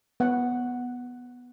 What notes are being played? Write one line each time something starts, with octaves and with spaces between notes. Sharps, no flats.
B3 F#5